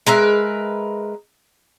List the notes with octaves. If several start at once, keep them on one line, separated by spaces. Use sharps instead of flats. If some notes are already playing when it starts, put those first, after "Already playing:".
G#3 A#4 B4 E5